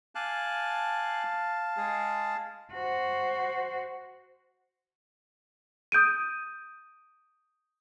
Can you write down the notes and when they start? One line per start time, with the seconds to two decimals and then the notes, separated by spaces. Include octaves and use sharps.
0.15 F5 G#5 A5 D6 F#6
1.77 G#3 G#4
2.73 F#4 C5
5.92 D#6 G6 D7 D#7